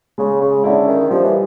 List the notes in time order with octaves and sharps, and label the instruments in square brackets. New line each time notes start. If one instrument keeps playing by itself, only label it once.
[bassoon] C#3 [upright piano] G#3
[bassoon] C#3
[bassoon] D3 [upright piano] C#4 E4
[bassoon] D#3
[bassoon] F3 [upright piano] G3
[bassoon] E3